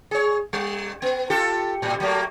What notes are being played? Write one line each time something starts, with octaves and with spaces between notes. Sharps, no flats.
G#4 C#5
G3
B3
F4 G4 A4
A2 G3
F#3 A3 A#3